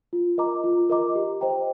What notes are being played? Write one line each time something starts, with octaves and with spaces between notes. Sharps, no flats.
F4
A#4 D#5 A#5 D6
F4
A#4 D#5 A#5 D6
G4
C5 D#5 G5 A#5